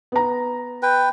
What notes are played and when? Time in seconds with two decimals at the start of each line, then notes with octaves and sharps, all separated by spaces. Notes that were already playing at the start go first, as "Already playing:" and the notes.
0.12 B3 A#5
0.83 B4 G5